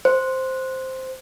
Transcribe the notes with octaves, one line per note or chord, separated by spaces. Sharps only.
C5